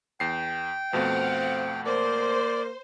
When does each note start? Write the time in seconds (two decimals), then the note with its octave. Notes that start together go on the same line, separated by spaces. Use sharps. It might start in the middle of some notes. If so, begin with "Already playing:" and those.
0.20 E2 G5 C7
0.93 F2 B2 A3 C4 F5 F#5
1.86 A#3 C5 D5